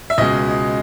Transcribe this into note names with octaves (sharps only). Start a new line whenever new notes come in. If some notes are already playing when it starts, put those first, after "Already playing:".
E5
C#2 B2 G#3 D#5